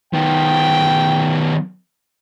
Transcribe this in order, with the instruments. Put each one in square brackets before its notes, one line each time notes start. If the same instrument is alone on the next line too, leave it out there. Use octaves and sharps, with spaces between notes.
[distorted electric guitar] D#3 B3 [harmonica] G5